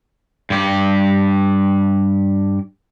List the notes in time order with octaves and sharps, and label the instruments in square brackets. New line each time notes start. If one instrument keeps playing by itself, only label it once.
[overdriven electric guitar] G2 G4